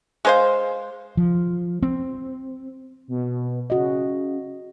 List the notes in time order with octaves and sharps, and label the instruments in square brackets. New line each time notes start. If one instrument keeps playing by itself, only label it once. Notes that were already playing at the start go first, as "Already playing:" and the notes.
[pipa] G#3 C5 F5
[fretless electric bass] F3
C4
[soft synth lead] B2
[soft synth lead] C#3 [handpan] F#4 D#5